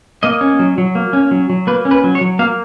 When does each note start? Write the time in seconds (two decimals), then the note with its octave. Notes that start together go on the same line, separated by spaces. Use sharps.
0.23 A#3 D#5
0.41 C#4
0.59 F#3
0.78 F#3
0.95 A#3
1.13 C#4
1.31 F#3
1.50 F#3
1.67 A#3 B4
1.85 C#4
1.91 B4
2.04 F#3
2.15 C#5
2.21 F#3
2.39 A#3 F5